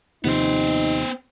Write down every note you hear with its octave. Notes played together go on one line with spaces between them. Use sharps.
D#2 C3 F3 B3 D#4 C5